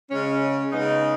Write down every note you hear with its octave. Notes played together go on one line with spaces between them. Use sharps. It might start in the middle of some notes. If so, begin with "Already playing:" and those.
C#3 G#3 C#4
C#3 G#3 B3 D#4